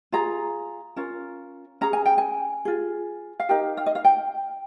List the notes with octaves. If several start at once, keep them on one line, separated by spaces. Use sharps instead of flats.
F4 G#4 A#5
C#4 F4 A#4
C#4 G#4 A#5
G#5
G5
G#5
F4 G#4
F5
D#4 G4 A#4 G5
F5
D#5
F5
G5